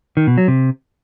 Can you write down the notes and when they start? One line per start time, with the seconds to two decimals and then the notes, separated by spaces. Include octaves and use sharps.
0.17 D#3
0.27 B2
0.38 F#3
0.48 C3